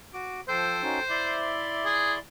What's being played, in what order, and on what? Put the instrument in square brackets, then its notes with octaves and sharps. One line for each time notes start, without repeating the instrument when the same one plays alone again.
[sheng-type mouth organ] F#4 D6
[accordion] F3 E6 [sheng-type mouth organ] A4 G5 [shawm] C5
[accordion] C#4 D#4 F#4
[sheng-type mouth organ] E4 D5 C6 [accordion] E5 D6
[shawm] G#4